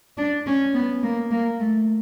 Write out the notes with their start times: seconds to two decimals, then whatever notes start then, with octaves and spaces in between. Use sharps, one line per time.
0.18 D4
0.47 C#4
0.74 B3
1.03 A#3
1.31 A#3
1.60 A3